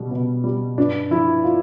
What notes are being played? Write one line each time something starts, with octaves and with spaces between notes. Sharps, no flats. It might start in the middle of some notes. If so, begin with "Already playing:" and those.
Already playing: B2 G3
B2
G3
G2 D4
F3 E4
F4